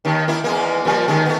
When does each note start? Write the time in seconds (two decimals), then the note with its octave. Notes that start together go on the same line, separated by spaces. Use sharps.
0.05 D#2 D#3
0.28 A#3 E4
0.44 E2 G#3 A#3
0.85 A#2 F3 G3
1.08 D#2 D#3 G#3
1.25 A3 B3